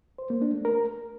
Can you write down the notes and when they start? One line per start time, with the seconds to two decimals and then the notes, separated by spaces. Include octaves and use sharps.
0.18 C5
0.30 A#3
0.42 D4
0.53 A3
0.65 A#4